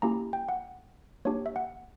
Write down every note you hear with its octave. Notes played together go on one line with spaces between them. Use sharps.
A#3 C#4 E4 G4 A#5
G5
F#5
A#3 D4 G4 C#5
E5
F#5